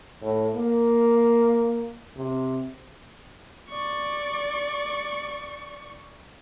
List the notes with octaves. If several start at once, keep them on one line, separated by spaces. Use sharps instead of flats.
A2
A#3
C3
D5 C#6